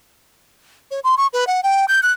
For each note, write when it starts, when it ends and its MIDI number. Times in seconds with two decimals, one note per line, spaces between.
0.91 1.00 73
1.04 1.15 84
1.17 1.27 85
1.33 1.47 71
1.47 1.63 78
1.63 1.85 79
1.88 2.01 91
2.03 2.12 90